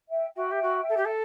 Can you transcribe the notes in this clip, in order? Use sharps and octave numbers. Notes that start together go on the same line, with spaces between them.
E5 G5
F#4 E5 G5
G4
F#4
A4
G4
A4